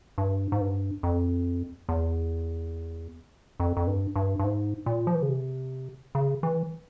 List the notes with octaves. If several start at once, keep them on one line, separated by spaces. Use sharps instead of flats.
G2
G#2
G2
F2
E2
F2
F2
G2
G2
G2
G#2
A#2
F3
E3
C#3
C3
C#3
E3